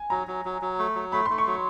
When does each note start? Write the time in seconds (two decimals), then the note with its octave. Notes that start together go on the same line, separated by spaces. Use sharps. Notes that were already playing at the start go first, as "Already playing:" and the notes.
Already playing: G#5
0.10 F#3 A#5
0.27 F#3
0.45 F#3
0.62 F#3
0.79 A3
0.95 F#3
1.12 A3 B5
1.26 A3 C6
1.38 C#6
1.47 F#3